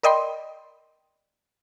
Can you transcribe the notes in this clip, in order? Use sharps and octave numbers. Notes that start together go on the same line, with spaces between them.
A#4 D5 D#5 G5 B5 C6